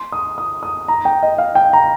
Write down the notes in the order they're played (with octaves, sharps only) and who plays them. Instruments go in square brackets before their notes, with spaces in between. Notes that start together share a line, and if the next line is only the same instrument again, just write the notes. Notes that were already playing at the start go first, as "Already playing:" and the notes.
Already playing: [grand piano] C6
D#6
D#6
D#6
A#5
G5
D#5
F5
G5
A#5